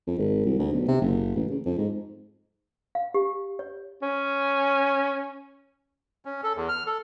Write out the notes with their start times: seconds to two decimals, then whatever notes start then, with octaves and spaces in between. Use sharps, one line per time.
0.07 F2
0.19 G#1
0.45 C2
0.59 D2
0.72 B1
0.88 C3
1.01 F#1
1.36 A1
1.50 C#3
1.66 F2
1.78 G#2
2.95 F5
3.14 G4
3.59 C#5
4.02 C#4
6.25 C#4
6.43 A4
6.56 E2
6.69 F6
6.87 A4